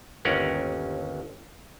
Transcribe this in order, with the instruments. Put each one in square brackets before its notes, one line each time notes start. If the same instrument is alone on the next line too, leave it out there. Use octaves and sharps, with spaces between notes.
[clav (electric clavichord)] G1 D#2 C#4 A#4 F#5